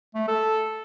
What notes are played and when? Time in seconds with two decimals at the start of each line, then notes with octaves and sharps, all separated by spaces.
0.15 A3
0.28 A4